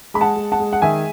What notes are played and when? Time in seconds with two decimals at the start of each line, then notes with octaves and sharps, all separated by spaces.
0.14 G#3 B5
0.21 F#5 A5
0.36 G#3
0.52 F#5 A5
0.60 G#3
0.73 F#5
0.82 D#3 E5 G#5